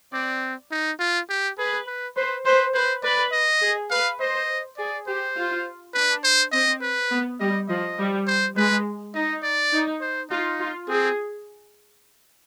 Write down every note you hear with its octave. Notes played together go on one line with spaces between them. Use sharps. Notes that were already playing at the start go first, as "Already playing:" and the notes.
C4 D5
D#4
F4
G4
G#4 B4
B4
B4 C5
B4 C5
B4 C5
B4 D5
D#5
G#4
B4 F5
C5 D#5
G#4 D5
G4 C5
F4
D4 B4
C5
C4 D#5
B4
B3
G3 D#5
F3 D#5
G3
C5
G#3 B4
D#4 D#5
D5
D#4
C5
D#4 F4
F4
C4 G#4